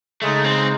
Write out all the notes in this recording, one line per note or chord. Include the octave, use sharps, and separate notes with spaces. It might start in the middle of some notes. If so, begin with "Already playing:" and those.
C#3 G#3 A3 D#4
C4